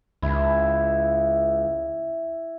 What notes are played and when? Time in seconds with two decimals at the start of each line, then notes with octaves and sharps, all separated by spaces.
0.22 C#2 E4